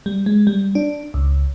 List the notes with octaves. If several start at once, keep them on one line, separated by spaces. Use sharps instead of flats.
G3
G#3
G3
D4
C#2